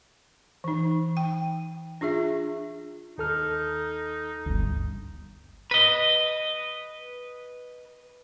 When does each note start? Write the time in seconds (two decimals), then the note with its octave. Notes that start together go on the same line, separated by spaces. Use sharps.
0.64 E3 D#4
1.17 G5
2.01 D4 F4 G#4 E5
3.18 D#2 D#4 A4 F6
4.46 G1 D2
5.71 B4 D#5